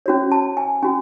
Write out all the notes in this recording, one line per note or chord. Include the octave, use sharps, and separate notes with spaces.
C#4 F#4 C#5
A5
G#5
C#4 F#4 G#5